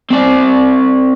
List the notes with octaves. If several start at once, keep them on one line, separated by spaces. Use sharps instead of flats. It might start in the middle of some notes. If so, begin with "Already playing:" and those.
C4 D5